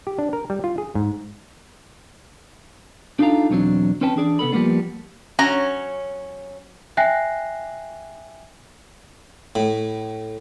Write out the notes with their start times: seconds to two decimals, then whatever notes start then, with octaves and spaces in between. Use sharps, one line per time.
0.07 G4
0.19 D4
0.33 A#4
0.50 G3
0.64 F4
0.78 G#4
0.95 G#2
3.19 D4 D#4 F4 A4 F5 A#5
3.50 B1 E2 F#3 C4 D4
4.01 C4 C#4 B4 G5 A5
4.16 E3 D4 G#4 D5
4.39 C3 B3 A4 B5
4.52 F3 G3 G#3 A#3 B3 D4
5.39 F#3 C#4 A#5
6.97 E5 G5 G#5 F#6 A#6 C7
9.55 A2